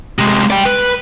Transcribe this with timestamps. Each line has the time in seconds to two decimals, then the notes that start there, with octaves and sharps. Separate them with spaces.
0.18 C3 G#3
0.50 D5 G5
0.65 B4